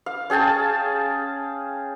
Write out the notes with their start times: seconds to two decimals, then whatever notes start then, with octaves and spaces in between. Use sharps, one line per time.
0.06 F5
0.30 C#4 G#4 G5 A5